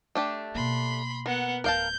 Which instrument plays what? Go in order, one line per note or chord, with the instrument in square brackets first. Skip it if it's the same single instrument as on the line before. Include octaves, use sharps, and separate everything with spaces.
[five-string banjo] A3 D4 G4
[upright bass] B2 A#3 [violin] B5 C6
[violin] B3 F#5 [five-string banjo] A#4
[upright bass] D1 [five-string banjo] A#4 F5 A5 [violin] G6